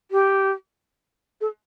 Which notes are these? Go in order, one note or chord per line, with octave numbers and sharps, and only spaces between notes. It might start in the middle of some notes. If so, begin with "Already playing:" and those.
G4
A4